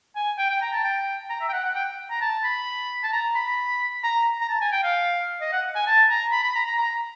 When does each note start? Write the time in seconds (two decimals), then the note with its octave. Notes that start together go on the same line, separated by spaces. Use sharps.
0.16 G#5
0.38 G5
0.50 G5
0.61 A#5
0.73 A5
0.84 G5
1.30 A#5
1.41 E5
1.49 G5
1.53 F#5
1.64 F#5
1.75 G5
2.10 A#5
2.21 A5
2.44 B5
3.04 A5
3.13 A#5
3.35 B5
4.04 A#5
4.40 A#5
4.49 A5
4.61 G#5
4.72 G5
4.84 F5
5.41 D#5
5.52 F#5
5.75 G#5
5.87 A5
6.09 A#5
6.32 B5
6.44 B5
6.55 A#5
6.67 A#5
6.78 A#5